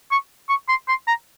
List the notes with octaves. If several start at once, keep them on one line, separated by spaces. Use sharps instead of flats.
C#6
C#6
C6
C6
A#5